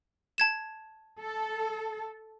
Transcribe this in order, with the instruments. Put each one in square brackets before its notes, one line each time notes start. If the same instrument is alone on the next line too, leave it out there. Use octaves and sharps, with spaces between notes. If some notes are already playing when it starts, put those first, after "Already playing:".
[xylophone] A5 G#6 E7
[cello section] A4